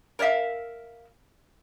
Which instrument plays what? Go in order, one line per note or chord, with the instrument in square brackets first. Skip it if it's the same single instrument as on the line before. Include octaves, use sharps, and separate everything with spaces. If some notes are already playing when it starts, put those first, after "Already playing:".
[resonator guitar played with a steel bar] A#4 C#5 D5 E5 F5